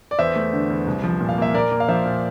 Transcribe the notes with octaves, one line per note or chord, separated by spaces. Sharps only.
D5
E2 C5 E5
A3
D3
E2
C2
F3
A#2
F5
A#3 E5
A#2 A#4 D5
A#3
F5
F3 C5 E5
A#2